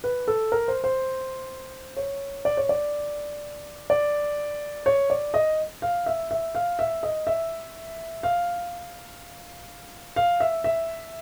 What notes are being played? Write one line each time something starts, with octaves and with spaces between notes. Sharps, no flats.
B4
A4
A#4
C5
C5
C#5
D5
C#5
D5
D5
C#5
D5
D#5
F5
E5
E5
F5
E5
D#5
E5
F5
F5
E5
E5